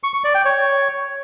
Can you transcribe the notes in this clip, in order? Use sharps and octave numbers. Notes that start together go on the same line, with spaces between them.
C#6
C#6
D5
G5
C#5